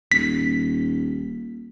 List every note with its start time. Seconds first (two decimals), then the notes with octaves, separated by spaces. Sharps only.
0.12 D#1 B6